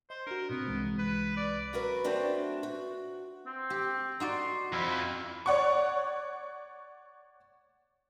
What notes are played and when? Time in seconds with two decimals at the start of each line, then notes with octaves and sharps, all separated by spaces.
0.10 C5 D#5
0.27 D4 F#4 A#4
0.50 A2 C3 B3 C4
0.67 C2 E3 G#3
0.99 B4
1.37 D5
1.73 F#3 F#4 A#4 B4
2.04 A3 C4 D4 F#4 A4
2.63 F#4
3.46 C4
3.70 G4
4.20 D#4 F#4 D5 C6
4.73 F2 E4
5.46 C#5 D5 F#5 C#6